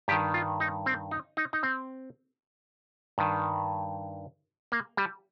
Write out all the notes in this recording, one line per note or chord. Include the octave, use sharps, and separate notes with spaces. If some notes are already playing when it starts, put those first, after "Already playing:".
G2 D#3 G4
F4
D#4
C4
D#4
D#4
D#4
C4
G2 D#3
A#3
G3